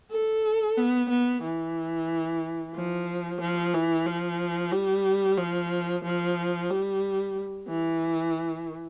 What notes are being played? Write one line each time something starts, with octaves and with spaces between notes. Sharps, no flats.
A4
B3
B3
E3
F3
F3
E3
F3
G3
F3
F3
G3
E3